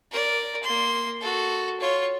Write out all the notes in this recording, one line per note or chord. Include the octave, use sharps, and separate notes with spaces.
A#4 D5
A#3 C6
F#4 A4
F4 C#5